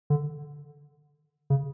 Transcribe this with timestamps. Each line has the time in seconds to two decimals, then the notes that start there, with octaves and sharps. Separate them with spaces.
0.10 D3
1.50 C#3